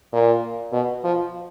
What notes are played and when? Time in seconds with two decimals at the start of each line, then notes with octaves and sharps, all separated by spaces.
0.13 A#2
0.73 B2
1.04 F3